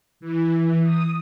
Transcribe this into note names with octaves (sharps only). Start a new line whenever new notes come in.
E3
D#6